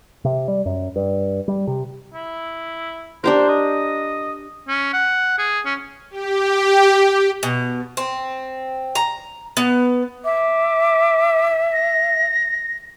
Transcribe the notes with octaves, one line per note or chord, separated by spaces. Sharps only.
C3
G3
F#2
G2
G3
C3
E4
D4 G4 A#4 C5
D#5
C#4
F#5
G#4
C#4
G4
B2
C4
A#5
B3
E5 D6
A#6